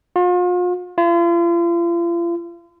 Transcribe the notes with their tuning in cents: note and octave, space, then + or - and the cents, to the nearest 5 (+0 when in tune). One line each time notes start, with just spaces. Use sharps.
F4 +40
F4 -40